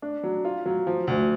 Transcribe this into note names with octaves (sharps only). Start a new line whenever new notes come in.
D4
F#3
F4
F#3
F3
D2